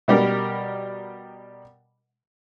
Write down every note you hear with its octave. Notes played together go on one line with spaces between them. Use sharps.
B2 G3 G4 A#4